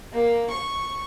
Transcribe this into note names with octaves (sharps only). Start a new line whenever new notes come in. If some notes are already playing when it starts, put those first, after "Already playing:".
A#3
C#6